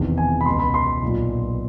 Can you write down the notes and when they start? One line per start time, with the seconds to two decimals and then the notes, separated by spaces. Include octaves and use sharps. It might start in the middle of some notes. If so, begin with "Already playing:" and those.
Already playing: E1 E2 C3 D#3
0.18 G#5
0.41 B5
0.46 C#2 B2 C6
0.60 B5
0.74 C6
1.02 B1 A#2